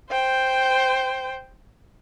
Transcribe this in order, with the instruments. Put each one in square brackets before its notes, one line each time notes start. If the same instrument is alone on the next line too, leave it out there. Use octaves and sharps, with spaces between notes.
[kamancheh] C5 G5